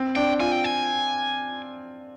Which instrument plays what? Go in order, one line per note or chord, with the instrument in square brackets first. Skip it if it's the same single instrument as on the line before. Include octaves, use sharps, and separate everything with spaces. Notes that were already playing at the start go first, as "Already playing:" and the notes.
Already playing: [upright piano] C4
[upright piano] D4 [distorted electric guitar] G5
[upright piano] F4 [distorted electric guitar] G#5
[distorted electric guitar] G5
G#5